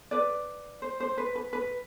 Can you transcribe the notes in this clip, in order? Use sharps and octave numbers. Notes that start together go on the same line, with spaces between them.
B4 D5
C5
C5
B4
B4
B4